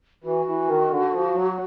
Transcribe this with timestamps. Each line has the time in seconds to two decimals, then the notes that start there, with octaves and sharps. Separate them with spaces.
0.24 E3 F#4
0.46 E3
0.68 D#3
0.90 D3
1.12 F3
1.34 F#3